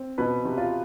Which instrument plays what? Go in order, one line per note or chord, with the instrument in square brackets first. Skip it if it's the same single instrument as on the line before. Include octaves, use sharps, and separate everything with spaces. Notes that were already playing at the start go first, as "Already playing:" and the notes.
Already playing: [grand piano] C4
[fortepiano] B2 [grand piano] B4
[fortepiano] C3
[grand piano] F4